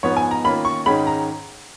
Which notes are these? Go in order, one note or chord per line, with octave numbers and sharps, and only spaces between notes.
G#2 F3 B3 D#4 C#5
G#5
A#5
D#3 A#3 C#4 F4 B5
C#6
G#2 D#3 G#3 C#4 B5
A#5